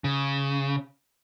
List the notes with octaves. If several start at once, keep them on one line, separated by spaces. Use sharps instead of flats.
C#3